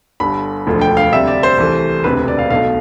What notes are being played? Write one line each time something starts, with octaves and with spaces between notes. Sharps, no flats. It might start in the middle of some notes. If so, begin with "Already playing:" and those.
G1 G2 D3 B5
E1 D2 D3 F3 A3
G5
F5
D2 C3 G3 E5
D5
C5
C2 C3 E3 A3
E1 D2 C3 B4
D5
F5
B1 B2 A3 F5